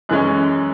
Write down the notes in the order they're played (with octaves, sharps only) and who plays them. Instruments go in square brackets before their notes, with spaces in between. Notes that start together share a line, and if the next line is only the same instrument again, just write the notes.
[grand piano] F#2 E3 G#3 C#4 F#6